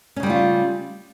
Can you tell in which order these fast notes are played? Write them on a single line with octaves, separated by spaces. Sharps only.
C#4 C#3 G3 A3 F4